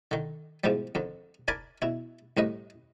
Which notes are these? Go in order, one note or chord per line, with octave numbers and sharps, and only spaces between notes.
D3 D#3
G#2 B2 E3 F3 G3
F2 D3
D4 A#4 G#5 A5 B5 D6
B2 E4
C2 A2 B4 D#5